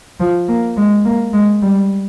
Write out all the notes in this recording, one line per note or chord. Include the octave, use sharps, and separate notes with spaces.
F3
A#3
G#3
A#3
G#3
G3